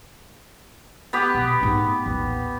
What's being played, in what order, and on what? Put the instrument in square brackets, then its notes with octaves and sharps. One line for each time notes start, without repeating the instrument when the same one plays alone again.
[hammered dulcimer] B3 G4
[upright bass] B2
G#2 A3
A1 D#2